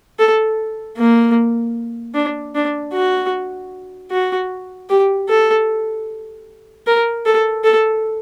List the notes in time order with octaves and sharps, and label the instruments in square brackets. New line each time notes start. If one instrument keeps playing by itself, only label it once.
[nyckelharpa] A4
A#3
D4
D4
F#4
F#4
G4
A4
A#4
A4
A4